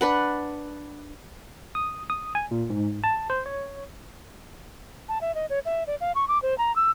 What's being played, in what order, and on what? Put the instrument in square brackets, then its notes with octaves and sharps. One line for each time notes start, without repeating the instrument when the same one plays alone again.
[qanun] D4 B4 F#5
[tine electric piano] D#6
D#6
G#5
A#2
G#2
A5
C5
C#5
[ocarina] A5
E5
D#5
C#5
E5
D5
F5
C#6
D6
C5
A#5
E6